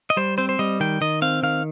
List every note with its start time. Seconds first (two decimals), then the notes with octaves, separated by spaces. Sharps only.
0.10 D#5
0.17 G3 C5
0.38 C4 C5
0.49 C5
0.59 G3 D#5
0.80 D#3 G5
1.01 D#3 D#5
1.22 C4 F5
1.43 D#3 F5